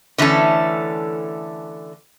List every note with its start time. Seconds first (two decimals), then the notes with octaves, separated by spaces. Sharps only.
0.18 D3 E3 A3 C#4 A4